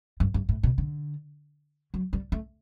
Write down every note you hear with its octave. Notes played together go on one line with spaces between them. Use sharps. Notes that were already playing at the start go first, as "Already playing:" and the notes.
G2
G2
A2
B2
D3
F#3
G3
A3